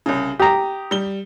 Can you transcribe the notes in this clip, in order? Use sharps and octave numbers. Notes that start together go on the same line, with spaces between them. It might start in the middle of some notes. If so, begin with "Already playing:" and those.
C2 C#3
G4 A#5 D#6
G3 G7